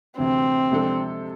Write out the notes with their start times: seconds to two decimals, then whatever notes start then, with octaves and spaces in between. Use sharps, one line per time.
0.18 D2 C3 E3 C4
0.71 C3 F3 G#3 D4 A4